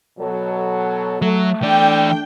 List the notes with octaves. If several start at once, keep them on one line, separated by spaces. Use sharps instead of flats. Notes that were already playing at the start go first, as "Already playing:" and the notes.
B2 F#3 A4
F#3 A3
E3 D4 D5 G5